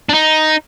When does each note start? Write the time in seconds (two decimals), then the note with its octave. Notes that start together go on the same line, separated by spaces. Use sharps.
0.09 D4
0.14 D#4